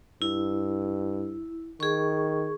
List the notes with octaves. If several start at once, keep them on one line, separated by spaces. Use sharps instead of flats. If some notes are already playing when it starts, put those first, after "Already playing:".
G2 E4
D#3 G#4 C#6